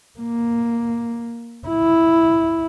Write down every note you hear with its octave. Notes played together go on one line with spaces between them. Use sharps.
A#3
E4